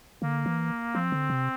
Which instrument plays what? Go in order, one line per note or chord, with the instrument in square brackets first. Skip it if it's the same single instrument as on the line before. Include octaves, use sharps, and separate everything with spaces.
[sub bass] D3 [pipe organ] A#3
[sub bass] E3
[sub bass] F3 [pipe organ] C4
[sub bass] D3
C3